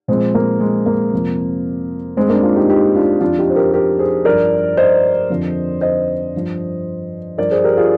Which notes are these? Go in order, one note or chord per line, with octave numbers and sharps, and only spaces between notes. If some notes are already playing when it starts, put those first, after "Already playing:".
A#2 F3 G#3 C4
A#3
G#3
A#3
F2 C3 F3
G2 D#3 G#3 C4
A#3 D4
D4 F4
D#4 G4
D#4 G4
D4 F4
F2 D#3 D4 F4
D#4 G4
C5
G4 A#4
G4 A#4
G#4 C5
G2 F3 A#4 D5
C5 D#5
F2 D3 F3
C5 D#5
G2 F3
G2 F3 A#4 D5
G#4 C5
G4 A#4
F4 G#4